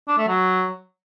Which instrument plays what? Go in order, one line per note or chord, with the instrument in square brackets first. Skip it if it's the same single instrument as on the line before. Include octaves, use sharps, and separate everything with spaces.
[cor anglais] D4
A3
F#3